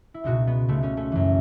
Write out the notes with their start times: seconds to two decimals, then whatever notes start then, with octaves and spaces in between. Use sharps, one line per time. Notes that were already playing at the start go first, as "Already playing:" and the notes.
0.14 E4
0.24 C#2 B2 D#4 F#4
0.47 B3
0.68 C#2 B2 A3
0.83 A3 C#4
0.97 A3 C#4
1.12 F#2 E3